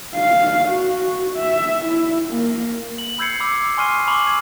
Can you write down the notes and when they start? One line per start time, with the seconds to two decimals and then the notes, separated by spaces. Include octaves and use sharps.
0.16 F5
0.68 F#4
1.36 E5
1.85 E4
2.29 A#3
2.98 F#7
3.19 B5 E6 G6 G#6 C7 C#7
3.40 B5 D6 E6
3.77 G#5 C6 C#6 F6 C7 D#7
4.07 A5 B5 C#6 D6 E6 F#7
4.25 E6 G#6